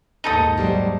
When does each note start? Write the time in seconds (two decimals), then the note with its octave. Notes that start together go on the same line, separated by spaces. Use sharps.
0.24 A#1 D#2 G#2 D#4 A4 D#6
0.57 F#3 G3 C5